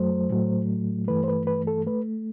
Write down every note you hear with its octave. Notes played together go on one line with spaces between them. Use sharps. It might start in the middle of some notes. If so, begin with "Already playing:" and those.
Already playing: F#2 F#3 A3 C5
A2 F#3 A3
G2 E3 A3 B4
C5
B4
B4
A4
A3 B4